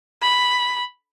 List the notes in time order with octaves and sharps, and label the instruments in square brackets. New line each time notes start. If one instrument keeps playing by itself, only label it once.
[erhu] B5